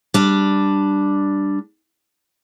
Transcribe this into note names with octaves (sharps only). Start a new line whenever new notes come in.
G3 D4